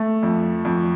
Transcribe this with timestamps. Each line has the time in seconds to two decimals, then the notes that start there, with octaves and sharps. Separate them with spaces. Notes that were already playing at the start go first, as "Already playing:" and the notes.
Already playing: A3
0.23 F2
0.65 F2